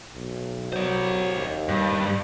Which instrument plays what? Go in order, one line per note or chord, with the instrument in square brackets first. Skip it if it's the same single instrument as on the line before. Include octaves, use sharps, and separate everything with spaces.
[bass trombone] B1
[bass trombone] F#3 [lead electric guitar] C5 D5
[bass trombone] D#2
[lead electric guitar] G2